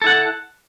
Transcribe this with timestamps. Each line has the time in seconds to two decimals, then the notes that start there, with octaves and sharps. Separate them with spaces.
0.02 A4
0.04 E4
0.07 F#5